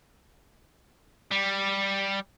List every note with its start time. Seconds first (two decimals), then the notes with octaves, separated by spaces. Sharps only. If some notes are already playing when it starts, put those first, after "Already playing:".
1.31 G3